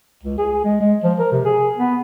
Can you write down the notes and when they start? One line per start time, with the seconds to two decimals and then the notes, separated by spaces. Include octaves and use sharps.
0.23 C#2
0.38 G#4
0.64 G#3
0.81 G#3
1.04 F3
1.19 A#4
1.32 C3
1.45 G#4
1.78 B3